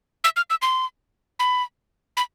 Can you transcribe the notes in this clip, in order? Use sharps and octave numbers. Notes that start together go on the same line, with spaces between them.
E6
F6
E6
C6
B5
B5